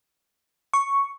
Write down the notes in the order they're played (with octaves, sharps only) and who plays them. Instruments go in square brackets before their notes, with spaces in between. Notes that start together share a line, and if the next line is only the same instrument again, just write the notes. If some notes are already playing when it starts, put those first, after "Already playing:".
[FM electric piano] C#6